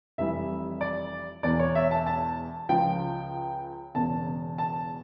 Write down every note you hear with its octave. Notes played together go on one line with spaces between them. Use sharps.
F1 F2 E3 G3 E5
D5
E1 E2 E3 D5
C#5
E5
A5
A5
C#2 C#3 F3 G5
E1 E2 C#3 A5
A5